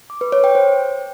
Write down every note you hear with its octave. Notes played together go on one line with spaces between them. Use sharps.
D6
B4
C#5
G5
C5